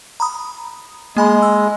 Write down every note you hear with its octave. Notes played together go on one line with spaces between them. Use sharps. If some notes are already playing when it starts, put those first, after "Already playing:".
A#5 B5 D#6
G#3 A#3 G#5 B5
E6